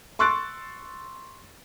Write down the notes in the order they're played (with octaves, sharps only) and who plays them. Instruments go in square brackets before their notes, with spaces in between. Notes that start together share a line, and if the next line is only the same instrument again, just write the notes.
[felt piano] C6 C#6 E6 F#6 A6 D7